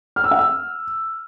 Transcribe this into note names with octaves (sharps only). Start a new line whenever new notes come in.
F6
E6
F#5
E6